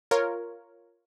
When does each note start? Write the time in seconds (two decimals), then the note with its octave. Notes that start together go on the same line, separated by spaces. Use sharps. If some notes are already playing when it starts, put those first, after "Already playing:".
0.11 F4 A#4 C#5